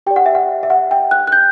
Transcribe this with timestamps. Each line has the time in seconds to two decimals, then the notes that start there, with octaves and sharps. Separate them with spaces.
0.07 G4 D5 G5
0.16 F#5
0.26 E5
0.35 F#5
0.63 E5
0.70 F#5
0.91 G5
1.11 F#6
1.27 F#6
1.32 G6